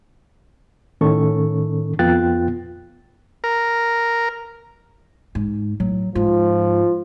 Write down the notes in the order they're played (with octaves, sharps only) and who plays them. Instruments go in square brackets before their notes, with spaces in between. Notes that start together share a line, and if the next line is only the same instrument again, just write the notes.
[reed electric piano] A2 D#3 C#4 A4 C#6
F2 B3 F4 G5 F#6 A6
[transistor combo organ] A#4
[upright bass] G#2
[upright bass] A2 [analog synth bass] F#3
[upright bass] G#2 [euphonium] F3 [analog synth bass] F4